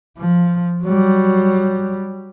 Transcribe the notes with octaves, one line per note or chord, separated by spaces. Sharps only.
F3
F#3 G3